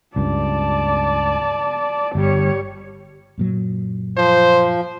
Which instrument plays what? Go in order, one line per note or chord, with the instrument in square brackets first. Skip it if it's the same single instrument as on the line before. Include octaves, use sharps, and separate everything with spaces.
[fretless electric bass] C#2 G2 [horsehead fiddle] D5 A5
[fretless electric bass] G1 [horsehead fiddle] G3 C#5
[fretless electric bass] F#2 A#2 F#3
[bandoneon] F3 [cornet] C5